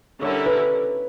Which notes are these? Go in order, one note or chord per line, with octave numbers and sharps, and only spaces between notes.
D3 G3 C#4 E4 A#4 C#5
B4